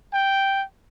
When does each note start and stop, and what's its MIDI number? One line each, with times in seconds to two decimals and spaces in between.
0.12 0.62 79